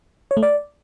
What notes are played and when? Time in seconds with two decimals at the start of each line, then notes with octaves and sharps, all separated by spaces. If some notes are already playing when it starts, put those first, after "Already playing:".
0.31 C#5
0.37 A3
0.43 D5